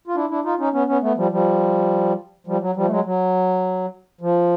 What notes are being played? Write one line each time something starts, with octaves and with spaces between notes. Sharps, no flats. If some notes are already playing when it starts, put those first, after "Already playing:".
F4
D4 E4
D4 E4
D#4 F4
C#4 D#4
B3 C#4
B3 C#4
A3 B3
F3 G3
F3 G3
F3 G3
F#3
F3 G3
A3
F#3 G#3
F#3
F3